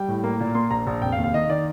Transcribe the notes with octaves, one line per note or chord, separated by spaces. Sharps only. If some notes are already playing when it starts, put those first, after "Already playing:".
Already playing: G3 G5
A2
A#3
A#2
A#3 C6
A#1 A#5
A#1
F1 G5
F5
D#2
F5
D#3 D#5
D#3 D5